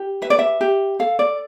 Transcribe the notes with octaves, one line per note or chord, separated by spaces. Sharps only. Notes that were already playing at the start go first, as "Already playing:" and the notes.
Already playing: G4
B4 E5
D5
E5
G4
A4 F5
D5